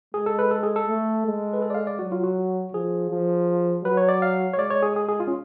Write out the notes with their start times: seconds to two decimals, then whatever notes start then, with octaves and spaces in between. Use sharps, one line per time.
0.14 G#3 G#4
0.26 A4
0.39 B4
0.51 A4
0.63 G#4
0.76 A4
0.88 A3
1.26 G#3
1.53 B4
1.62 A4
1.70 D5
1.74 F5
1.87 D5
1.99 F#3 F#4
2.12 F4
2.24 F#4
2.74 F3 G#4
3.10 F3
3.84 F#3 B4
3.97 C#5
4.09 D5
4.22 F5
4.53 C#5
4.58 G#3 D5
4.70 C#5
4.83 G#4
4.96 G#4
5.08 G#4
5.20 F4
5.27 C#4